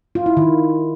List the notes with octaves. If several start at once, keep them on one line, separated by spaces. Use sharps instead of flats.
F4
E4
D#3